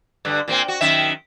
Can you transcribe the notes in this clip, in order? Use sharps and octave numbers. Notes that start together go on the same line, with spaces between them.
G2 D3
A#2 A#3 C4
F#4
F#2 D#3 E5